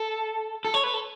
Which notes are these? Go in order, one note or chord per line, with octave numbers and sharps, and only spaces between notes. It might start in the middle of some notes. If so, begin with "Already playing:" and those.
Already playing: A4
A4
C#5
B4
A4